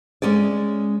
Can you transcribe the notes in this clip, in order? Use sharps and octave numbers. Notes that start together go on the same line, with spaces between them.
G#3 C#4 G#4 D5